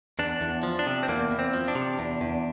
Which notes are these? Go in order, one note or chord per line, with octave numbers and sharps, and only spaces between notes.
E2 D4
E2
F3
D4
C3
C4
E2 A#3
E2
C4
F3
D4
C3
E2
E2